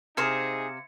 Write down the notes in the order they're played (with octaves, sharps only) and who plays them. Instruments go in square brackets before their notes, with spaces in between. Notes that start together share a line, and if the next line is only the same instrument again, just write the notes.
[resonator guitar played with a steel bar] C3 [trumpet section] D#4 G#4 [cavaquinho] C5 F5 [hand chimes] E5 G#6 C#7